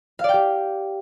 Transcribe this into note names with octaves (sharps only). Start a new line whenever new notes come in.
G4 D5 F5 G5